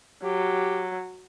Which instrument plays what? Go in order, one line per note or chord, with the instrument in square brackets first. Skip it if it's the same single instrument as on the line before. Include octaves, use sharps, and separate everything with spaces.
[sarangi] F#3 [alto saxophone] G4